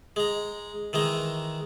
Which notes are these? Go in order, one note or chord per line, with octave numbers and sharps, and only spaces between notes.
G#3 A#5
D#3 E3 G#3 A#5